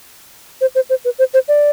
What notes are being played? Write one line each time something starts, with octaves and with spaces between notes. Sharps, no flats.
C5
C5
C5
B4
C5
C5
D5